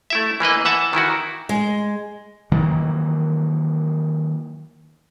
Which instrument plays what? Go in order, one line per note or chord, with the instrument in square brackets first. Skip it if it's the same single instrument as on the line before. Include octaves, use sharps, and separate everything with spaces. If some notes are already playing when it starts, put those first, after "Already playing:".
[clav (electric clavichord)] A3 E4 E5
E3 A#3 B4 D#5
E3 E5 F#5 A5
D#3 E3 E4 F#4
[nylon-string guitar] G#3
[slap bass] D#3 E3 F#3 A#3